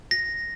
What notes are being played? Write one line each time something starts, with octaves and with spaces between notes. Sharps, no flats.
A#6